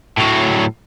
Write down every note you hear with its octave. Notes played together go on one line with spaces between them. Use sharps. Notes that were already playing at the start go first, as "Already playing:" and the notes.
A2 F#3